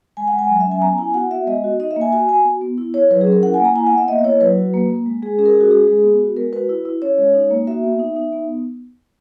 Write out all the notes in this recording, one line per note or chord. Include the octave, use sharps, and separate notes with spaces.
G#3 G#5
F#5
G#3
G#5
F#3
E5
C#4
G#5
B3 A#5
E4 G#5
F#4 F#5
B3 E5
G#3 D#5
F#4
D#4 D#5
E5
A#3
G#5
F#4 G#5
F#4 G#5
B3
B3
E4
E4 C#5
F#3 B4
G#4
C#4
A#4
E4 F#5
G#5
A#3
A#5
E4 G#5
F#5
B3
E5
A#3 D#5
D#5
E4 C#5
F#3 B4
F#4
A#3
A#3
G#3
G#3 G#4
C#4 G#4
A#4
G#4
C#4
F#4
G#3 G#4
G#3
B3
F#4
G#3 A#4
F#4 B4
E4
E4
C#4 C#5
G#3
D#4
A#3
F#4 E5
B3
D#4
D#4
B3